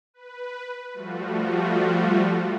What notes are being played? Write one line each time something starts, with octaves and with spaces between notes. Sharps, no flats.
B4
F3 G3 A3 F4 F#4